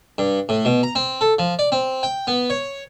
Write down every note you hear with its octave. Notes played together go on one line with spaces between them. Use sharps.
G2
A2
B2
A#5
C4
A4
F3
D5
C4
G5
B3
C#5